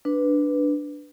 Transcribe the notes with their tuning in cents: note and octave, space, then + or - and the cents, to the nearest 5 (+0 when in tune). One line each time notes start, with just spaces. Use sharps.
D4 +0 B4 +0